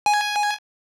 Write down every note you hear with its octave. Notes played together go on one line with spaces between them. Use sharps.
G#5